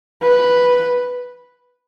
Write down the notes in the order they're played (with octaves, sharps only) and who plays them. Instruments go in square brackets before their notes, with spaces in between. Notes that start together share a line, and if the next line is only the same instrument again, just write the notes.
[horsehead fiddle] B4